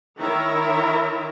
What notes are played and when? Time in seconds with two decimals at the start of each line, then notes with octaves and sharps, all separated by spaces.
0.17 D#3 E4 A#4 C#5 E5 A#5